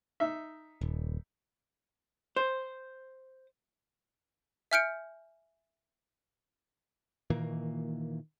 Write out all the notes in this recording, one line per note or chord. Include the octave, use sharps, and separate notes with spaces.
D#4 E5
D#1
C5
E5 G#5 F6 G6 C#7 D7
A#2 D#3 E3 A#3